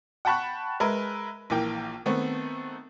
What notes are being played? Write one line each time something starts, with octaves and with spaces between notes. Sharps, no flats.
F#5 G5 A5 B5 C#6 F#6
G#3 A#4 B4 E5
A#1 E3 A#3 G5
D#3 A3 B3 C4